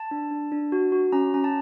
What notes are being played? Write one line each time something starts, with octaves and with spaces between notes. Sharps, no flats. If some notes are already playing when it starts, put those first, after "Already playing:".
Already playing: A5
D4
D4
D4
F#4
F#4
C#4 A#5
C#4 A#5
A5